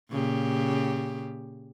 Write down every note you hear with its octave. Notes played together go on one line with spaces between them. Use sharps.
A#2 C#3 G4